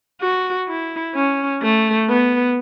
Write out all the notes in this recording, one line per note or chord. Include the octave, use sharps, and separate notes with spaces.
F#4
E4
C#4
A3
B3